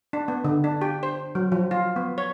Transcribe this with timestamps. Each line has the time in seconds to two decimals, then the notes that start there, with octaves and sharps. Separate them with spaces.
0.13 D4
0.28 B3
0.44 D3
0.64 D4
0.82 G4
1.03 C5
1.35 F#3
1.52 F3
1.71 F4
1.96 B3
2.18 C#5